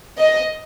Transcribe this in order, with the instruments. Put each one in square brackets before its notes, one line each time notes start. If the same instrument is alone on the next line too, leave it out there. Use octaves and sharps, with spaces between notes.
[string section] D#5